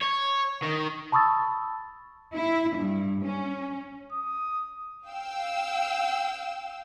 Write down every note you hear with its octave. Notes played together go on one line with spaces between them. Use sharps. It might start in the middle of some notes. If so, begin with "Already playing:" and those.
C#5
D#3
A5 B5 C#6 D#6 E6 A6
E4
G2
C#4
D#6
F5 G5 E6